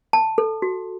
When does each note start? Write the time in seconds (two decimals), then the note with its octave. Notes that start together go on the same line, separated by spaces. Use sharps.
0.13 A5
0.38 A4
0.62 F#4